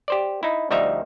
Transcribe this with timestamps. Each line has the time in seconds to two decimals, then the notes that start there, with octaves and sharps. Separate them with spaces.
0.08 G4 C5 D5
0.43 D#4 E4
0.70 D2 F3 G3 D#4 E5 A#5